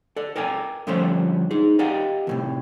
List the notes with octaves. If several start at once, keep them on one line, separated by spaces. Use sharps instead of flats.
A4 D5
A4 A#4 D5 G5 G#5
G2 D3 F3 A3 C#4 C5
D#4 G#4
G4 A#4 D5 D#5 F5 F#5
D#2 A2 C3